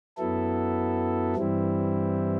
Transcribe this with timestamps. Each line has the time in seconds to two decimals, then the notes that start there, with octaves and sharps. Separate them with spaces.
0.18 F#2 F#3 B3 E4 A4
1.36 G2 E3 G3 C4 E4